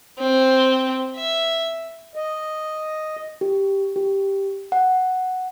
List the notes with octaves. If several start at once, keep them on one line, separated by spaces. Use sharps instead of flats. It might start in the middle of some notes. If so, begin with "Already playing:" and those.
C4
E5
D#5
G4
G4
F#5